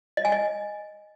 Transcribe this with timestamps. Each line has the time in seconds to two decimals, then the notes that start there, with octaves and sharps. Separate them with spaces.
0.17 D#5
0.25 G#5
0.32 D#5